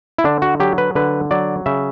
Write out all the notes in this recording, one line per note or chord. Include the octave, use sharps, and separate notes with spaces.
E4
D3 D4
F#4
F#3 G4
B4
D3 B4
F#3 D5
C#3 E5